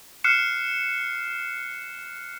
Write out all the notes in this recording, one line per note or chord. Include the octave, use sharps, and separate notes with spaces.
F6 F#6 C7 C#7 E7